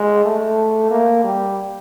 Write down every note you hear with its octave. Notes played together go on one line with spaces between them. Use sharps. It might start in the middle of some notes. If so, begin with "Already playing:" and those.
Already playing: G#3
A3
A#3
G3